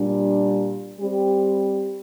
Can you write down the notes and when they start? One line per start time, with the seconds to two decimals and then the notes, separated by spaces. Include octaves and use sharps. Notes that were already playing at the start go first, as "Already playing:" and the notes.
Already playing: A#2 G3 D4
1.00 G3 C4 G4